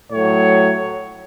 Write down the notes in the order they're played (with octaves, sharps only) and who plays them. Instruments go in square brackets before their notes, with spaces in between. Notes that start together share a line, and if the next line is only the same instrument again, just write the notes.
[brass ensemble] A2 F#3 C#5